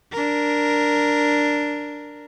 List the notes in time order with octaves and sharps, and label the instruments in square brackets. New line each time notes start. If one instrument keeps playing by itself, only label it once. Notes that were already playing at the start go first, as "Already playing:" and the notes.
[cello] D4 A#4